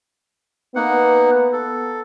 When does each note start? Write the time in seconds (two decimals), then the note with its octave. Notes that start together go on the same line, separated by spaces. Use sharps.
0.76 A#3 B3 D#4 F#5
1.53 A4